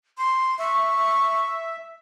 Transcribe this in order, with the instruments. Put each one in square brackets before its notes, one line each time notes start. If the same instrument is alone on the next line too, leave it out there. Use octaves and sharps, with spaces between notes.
[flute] C6
[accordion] E5 [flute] C#6